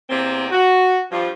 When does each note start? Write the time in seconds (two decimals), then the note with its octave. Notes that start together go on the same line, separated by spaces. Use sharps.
0.10 E2 C3 A#3 C4
0.51 F#4
1.11 G2 F3